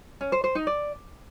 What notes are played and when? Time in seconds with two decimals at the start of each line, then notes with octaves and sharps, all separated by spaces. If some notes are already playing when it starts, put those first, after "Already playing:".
0.21 C#4
0.32 C5
0.44 C5
0.55 D#4
0.67 D5